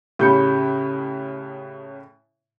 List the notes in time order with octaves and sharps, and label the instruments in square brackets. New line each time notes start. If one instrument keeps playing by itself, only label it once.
[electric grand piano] A2 G6 C#7 [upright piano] C#3 [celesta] G4 B5